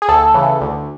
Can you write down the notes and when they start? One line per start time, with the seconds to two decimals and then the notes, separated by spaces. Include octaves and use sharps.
0.02 G#4
0.08 D2 A4
0.34 C#3 E3
0.61 D2